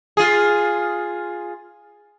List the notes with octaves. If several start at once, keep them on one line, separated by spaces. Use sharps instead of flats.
F4 G#4